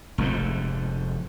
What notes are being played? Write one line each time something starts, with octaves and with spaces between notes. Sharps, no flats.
F1 F2 G#2